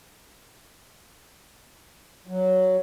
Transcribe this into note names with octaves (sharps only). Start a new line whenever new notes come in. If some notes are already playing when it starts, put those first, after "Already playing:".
F#3